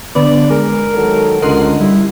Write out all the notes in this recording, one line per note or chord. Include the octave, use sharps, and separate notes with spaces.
D3 B3 D5
G#3 A#4
D#3 F#3 A4
C#2 D3 A#4 D#5 F#5 C6
G3 E4